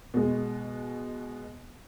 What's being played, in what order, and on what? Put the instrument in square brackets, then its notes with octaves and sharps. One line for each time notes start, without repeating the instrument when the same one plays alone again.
[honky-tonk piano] B2 G#3